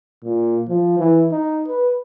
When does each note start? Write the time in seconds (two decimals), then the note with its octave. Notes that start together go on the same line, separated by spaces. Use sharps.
0.24 A#2
0.69 F3
0.99 E3
1.32 D#4
1.68 B4